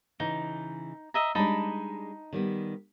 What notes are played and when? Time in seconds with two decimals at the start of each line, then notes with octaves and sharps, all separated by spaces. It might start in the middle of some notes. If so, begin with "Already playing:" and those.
0.20 C#3 E3 D#4
1.14 D#5 E5 A#5
1.35 G3 G#3 D4 D#4 A5 B5
2.33 D#3 G3 B3